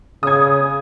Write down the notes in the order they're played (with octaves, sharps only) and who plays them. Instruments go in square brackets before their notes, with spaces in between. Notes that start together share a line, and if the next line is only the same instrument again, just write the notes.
[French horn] C#3 [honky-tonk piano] D#6 G#6